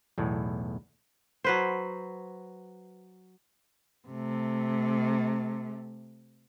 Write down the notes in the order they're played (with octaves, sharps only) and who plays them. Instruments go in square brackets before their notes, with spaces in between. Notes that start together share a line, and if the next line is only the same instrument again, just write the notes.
[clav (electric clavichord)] B1 E2 A2
[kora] F#3 B4 C5
[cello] C3 A3